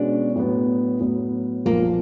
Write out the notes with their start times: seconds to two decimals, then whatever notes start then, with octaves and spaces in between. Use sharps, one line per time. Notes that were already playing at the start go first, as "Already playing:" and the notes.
Already playing: B2 G#3 C#4 D4 F#4
0.36 A2 F#3 B3
1.00 A2 F#3 B3
1.65 B1 A#2 F3 A#3